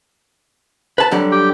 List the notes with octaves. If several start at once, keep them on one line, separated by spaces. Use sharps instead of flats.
B4 A5
D3 F#3 G3
G4 G5